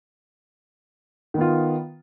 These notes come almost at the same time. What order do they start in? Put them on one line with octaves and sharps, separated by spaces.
D#3 B3 F4